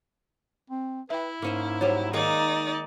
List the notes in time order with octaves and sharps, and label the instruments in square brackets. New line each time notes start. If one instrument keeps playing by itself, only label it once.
[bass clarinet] C4
[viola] E4 [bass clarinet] B4 [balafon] E5 G5
[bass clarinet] G#2 [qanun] A#3 C#4 C5
[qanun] F#3 G3 [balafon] C5 C#5
[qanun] D#3 G#3 A#3 [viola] D#4 D5